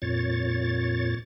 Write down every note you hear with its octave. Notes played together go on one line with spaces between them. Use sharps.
F2 A#2 C#5 A6